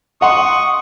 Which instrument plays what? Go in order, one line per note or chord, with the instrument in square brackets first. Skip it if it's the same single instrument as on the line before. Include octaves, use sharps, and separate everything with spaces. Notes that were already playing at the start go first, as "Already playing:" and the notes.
[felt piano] D#5 F#5 C6 [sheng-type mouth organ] C#6 D#6